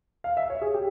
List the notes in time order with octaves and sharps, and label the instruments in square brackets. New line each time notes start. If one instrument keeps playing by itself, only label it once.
[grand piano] F5
E5
C#5
G#4
G4